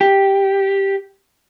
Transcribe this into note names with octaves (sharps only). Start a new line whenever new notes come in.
G4